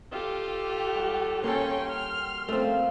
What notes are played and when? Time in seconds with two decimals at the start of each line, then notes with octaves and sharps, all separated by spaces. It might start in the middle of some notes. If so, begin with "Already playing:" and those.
0.12 F4 G4 A4 D#5
0.95 G3 F#4
1.44 A#3 C#4 A4 G5 C6
1.90 F6
2.49 A#2 C#3 F3 A3 C4